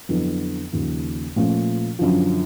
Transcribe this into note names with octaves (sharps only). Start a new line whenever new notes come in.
F2 D3 F#3 B3 E4
D#2 C#3 F3
A#2 F3 A3 C#4 F4
F#2 D3 F3